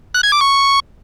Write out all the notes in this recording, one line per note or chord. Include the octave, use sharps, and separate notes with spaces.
F#6
G#6
D6
C#6